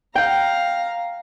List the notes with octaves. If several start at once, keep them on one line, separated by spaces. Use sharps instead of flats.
F5 G5 A#5 G6